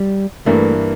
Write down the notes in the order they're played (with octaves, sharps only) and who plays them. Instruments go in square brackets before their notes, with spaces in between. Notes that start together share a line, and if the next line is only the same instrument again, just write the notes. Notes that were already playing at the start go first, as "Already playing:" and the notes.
Already playing: [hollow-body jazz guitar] G3
[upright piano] G2 E3 A#3 [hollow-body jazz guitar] A3